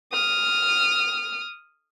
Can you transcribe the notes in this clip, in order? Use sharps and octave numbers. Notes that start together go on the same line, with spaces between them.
D#6 F6